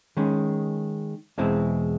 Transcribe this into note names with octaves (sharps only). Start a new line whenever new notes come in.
D#3 G#3 C#4
E2 B2 G#3 C4 E4